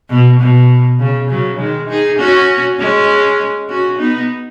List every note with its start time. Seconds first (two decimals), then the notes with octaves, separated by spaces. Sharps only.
0.10 B2
0.40 B2
0.99 C#3
1.29 C#3 F#3
1.59 D#3 G#3
1.89 D#4 G#4
2.19 C#4 F#4
2.79 G#3 C#4
3.69 C#4 F#4
3.98 B3 D#4